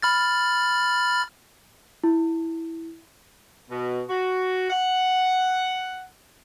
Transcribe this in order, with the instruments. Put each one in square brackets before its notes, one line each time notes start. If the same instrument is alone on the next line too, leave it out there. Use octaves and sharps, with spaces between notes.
[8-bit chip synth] B5 F6 A6
[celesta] E4
[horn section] B2
F#4
F#5